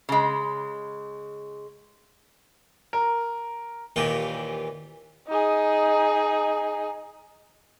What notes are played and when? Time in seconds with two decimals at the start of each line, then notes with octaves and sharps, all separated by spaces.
0.09 C#3 G#3
2.93 A#4
3.96 D#2 A#2 E3 G4
5.27 D#4 G#4